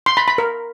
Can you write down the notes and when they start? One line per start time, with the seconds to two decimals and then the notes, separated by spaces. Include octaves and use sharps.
0.06 C6
0.17 B5
0.28 B5
0.38 A#4